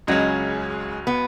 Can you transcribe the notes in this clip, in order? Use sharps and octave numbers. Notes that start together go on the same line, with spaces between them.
C#2 C#3 F#3 G#3 C#4
B3